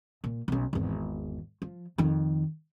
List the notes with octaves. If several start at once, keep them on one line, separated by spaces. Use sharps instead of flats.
A#2
B1 C#4
G#1 E2
F3
F2 D#3